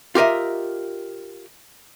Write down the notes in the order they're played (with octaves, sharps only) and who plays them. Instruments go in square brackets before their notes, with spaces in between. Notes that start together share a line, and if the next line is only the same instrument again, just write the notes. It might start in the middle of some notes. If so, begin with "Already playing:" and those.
[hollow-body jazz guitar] F4 G4 A#4 D#5 E5